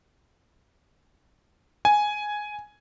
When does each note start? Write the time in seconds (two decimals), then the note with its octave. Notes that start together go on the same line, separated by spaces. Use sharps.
1.85 G#5